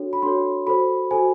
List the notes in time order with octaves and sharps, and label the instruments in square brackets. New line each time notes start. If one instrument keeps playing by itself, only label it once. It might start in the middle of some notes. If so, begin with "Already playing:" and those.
Already playing: [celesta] D4 F#4 A4 C#5
B5
D4 F#4 A4 C#5 C6
F#4 A4 C5 B5
F#4 A4 C5 G#5